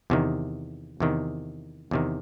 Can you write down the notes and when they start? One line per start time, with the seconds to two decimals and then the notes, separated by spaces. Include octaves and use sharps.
0.10 E2 C3 D#3
1.00 E2 C3 D#3
1.91 E2 C3 D#3